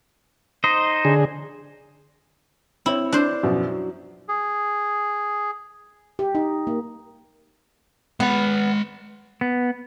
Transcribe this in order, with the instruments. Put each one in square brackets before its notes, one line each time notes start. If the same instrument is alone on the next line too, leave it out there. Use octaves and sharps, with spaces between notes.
[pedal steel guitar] D#4 C5 D#5
[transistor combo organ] D3 G#4
[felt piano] C4 C#5 [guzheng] E4
[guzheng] D4 C5
[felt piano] F#2 B2 F3
F#3
[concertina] G#4
[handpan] G4
D#4
A#3
[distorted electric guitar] G#3 B5 [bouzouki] B3
[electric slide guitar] B3